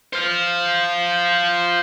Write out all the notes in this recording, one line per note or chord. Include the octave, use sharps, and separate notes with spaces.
C5 F5